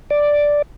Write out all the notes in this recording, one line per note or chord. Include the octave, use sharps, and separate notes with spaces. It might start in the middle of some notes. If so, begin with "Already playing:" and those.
D5